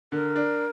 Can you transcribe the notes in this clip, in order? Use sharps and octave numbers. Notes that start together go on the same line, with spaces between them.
D3 A#4
D4